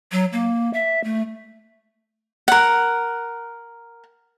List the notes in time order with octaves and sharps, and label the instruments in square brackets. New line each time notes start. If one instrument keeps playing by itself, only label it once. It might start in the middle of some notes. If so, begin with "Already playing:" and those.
[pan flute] F#3
A#3
E5
A3
[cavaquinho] A#4 F#5